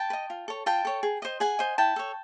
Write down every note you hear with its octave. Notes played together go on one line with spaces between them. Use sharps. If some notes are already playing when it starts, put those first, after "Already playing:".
Already playing: G5 A5
B4
D#5
F4
A4 C#5
F4 G5 A5
A4 C#5
G#4
C5 D#5
G#4 F#5 G#5
C5 D#5
E4 G5 A5
A4 C#5